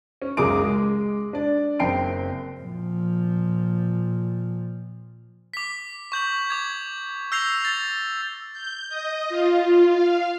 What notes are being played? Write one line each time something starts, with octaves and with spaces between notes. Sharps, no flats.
C#4
F#1 C#2 G#4 A#4 D6 D7
G#3
D4 D5
F#1 C4 G5 C7 D7
A#2 F3
D6 B6
C#6 G6 F#7
D6 G#6
E6 G6 A#6 C7 F7
A6
G6
D#5
F4
F5